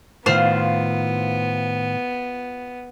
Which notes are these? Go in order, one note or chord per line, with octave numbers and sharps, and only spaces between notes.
A2 D#3 B3 F4 C5 F5 F6